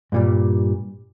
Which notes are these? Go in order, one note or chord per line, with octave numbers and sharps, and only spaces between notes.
G2 A#2 G3